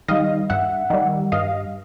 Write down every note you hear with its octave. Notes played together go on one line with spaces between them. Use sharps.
D#3 G3 D#5 F5
G2 E5 F#5
D#3 G3
G2 D#5 F5